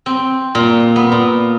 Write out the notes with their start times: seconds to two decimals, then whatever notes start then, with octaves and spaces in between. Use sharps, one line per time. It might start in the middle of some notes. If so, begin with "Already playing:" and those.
0.06 C4
0.55 A#2
0.96 B3
1.12 A#2